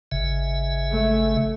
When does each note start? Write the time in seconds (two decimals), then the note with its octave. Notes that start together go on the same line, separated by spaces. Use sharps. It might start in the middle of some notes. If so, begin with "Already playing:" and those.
0.12 G#1 C#3 E5
0.91 A3